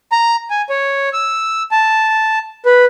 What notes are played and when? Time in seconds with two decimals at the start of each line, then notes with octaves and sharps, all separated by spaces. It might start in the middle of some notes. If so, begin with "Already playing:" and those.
0.12 A#5
0.50 G#5
0.70 C#5
1.13 E6
1.71 A5
2.66 B4